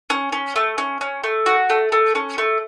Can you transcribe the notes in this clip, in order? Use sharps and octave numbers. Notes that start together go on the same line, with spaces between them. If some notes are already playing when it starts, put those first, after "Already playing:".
C#4
C#4
A3
C#4
C#4
A3
F#4
A3
A3
C#4
A3